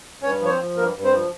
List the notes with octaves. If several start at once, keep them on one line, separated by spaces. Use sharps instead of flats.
G2 C#4 C#5
F3
C#5
C4 C5
F3
G2 A#3 A#4
G2
C4 C5
F3